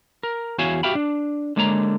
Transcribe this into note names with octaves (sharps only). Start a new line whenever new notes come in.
A#4
E2 F#4 C#5 E5 F5 G#5
F#4 G4 E5 F5 G5 B5
D4
D3 G#3 A#3 C#5 A5 A#5